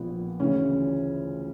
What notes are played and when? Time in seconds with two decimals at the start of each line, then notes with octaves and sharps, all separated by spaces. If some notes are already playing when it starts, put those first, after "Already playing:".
Already playing: A#1 A#2 B3
0.40 D2 C#3 E3 C#4